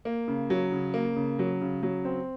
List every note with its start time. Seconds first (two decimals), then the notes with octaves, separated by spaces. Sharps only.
0.05 A#3
0.28 C#3
0.50 F#3
0.72 C#3
0.94 A#3
1.16 C#3
1.39 F#3
1.62 C#3
1.83 F#3
2.05 C4